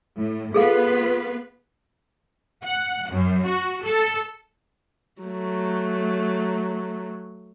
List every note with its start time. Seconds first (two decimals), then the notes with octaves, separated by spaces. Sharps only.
0.17 A2
0.54 B3 F4 G#4 A4 B4 F5
2.65 F#5
3.13 F#2
3.47 F#4
3.85 A4
5.22 F#3 A3